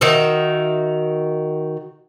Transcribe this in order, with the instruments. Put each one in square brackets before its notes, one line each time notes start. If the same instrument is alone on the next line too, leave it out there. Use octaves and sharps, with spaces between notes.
[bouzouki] D#3 F#4 E5